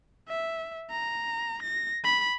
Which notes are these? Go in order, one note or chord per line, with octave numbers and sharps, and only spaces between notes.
E5
A#5
A#6
B5